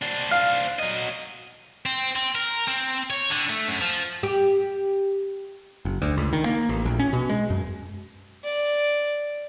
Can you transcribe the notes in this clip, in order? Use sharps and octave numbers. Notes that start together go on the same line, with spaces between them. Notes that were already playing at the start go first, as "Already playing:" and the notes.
D4 C5
F5
F#3 D#5
C4
C4
A#4
C4
C#5
D3
A3
F#2
F3
G4
F#1
D2
C#2
D#3
A#3
A1
A#1
C#4
B2
G#3
F#2
D5